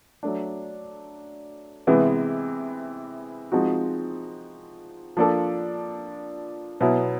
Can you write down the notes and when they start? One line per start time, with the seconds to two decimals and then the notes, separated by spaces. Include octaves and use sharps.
0.23 F#3 A3 D4
1.87 C3 E3 G#3 B3 E4
3.52 F3 G#3 C4 D#4 F#4
5.17 F3 A#3 D4 F4 A4
6.81 B2 F#3 B3 E4